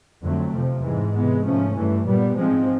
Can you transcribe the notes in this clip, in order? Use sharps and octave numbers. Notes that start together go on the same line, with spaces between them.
F2 D3 F#3 A3 C4
F2 C3 F3
G#2 E3 G#3
C3 E3 G#3 B3
G#2 F3 A3 C#4
G2 E3 A3
A#2 G3 B3
G#2 F3 G#3 C4